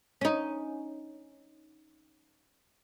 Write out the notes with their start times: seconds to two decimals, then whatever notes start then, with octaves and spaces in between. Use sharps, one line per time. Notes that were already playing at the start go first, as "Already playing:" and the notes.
0.21 C#4 D#4